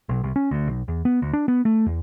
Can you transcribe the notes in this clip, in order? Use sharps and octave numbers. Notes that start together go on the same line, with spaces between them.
B1
C2
C#4
D2
B1
E2
B3
D2
D4
B3
A3
E2